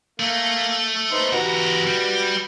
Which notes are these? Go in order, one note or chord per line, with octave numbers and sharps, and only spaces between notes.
A3 A#3
B3 D#4 C5
E2 F#4 G4 B4 A#5
G3